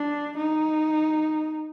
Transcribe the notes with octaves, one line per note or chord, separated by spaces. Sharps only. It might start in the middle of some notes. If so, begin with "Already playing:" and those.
Already playing: D4
D#4